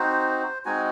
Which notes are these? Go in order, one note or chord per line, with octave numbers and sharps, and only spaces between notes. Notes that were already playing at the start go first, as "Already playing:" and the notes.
Already playing: C4 D#4 F#4 C5
G#3 C4 D#4 F#4 G#5